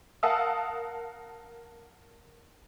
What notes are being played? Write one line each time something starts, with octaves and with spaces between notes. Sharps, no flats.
A#4 F5 F#5 A5 D#6 E6